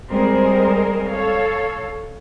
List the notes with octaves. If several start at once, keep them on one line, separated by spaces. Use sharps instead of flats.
G3 G#3 C4 G#4 A#4 C5
A4 C#5 F5